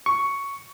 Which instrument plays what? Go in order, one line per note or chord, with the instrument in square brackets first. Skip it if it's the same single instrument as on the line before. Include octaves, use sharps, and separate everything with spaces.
[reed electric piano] C#6